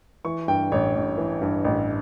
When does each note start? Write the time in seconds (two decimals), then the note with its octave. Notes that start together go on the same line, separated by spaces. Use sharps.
0.25 E3 C#6
0.48 G2 G5
0.72 A1 C#5
0.95 A1
1.18 E3
1.41 G2
1.64 A1